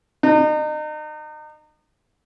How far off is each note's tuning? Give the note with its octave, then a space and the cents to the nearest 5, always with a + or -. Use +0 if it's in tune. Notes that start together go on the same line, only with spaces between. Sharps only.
D#4 -35